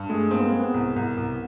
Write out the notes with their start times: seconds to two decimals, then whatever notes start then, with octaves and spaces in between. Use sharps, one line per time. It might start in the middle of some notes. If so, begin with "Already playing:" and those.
Already playing: G2
0.09 G#3 A3
0.31 A#3 C4
0.40 B3
0.45 A#3
0.53 G#3
0.60 B3
0.74 C2
0.96 C2
1.17 C2